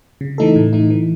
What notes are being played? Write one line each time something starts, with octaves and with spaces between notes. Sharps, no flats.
C#3
E3 A3 D#4 A4
A2
E3 A3 D#4
E3